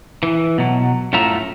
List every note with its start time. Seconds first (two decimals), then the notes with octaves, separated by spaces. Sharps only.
0.23 E3
0.58 B2 F#3
1.13 F#2 A2 A3 F4 E5 A#5